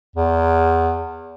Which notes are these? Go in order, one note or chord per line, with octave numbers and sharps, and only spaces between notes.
E2